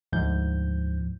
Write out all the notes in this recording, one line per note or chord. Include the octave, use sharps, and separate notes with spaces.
D2 G#2 F3 G6